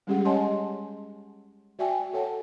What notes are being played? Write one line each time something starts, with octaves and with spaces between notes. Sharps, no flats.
G3 G#3 C#4 G4 G#4 F#5
C#5 D#5 F#5 G#5 A5 C6
F#4 D5 E5 G5 G#5
A4 C#5 F#5 A5